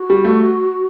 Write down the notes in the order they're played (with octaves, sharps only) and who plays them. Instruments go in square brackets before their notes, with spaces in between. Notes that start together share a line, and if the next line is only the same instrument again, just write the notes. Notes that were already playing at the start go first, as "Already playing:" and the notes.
Already playing: [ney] F#4
[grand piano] G3
A3